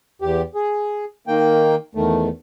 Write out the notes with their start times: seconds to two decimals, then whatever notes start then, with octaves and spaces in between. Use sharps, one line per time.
0.22 E2 G4
0.55 G#4
1.27 D#3 A#3 G5
1.95 E2 D#3 A3